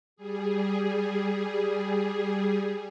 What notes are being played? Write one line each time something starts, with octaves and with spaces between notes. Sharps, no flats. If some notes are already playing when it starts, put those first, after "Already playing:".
G3 G#4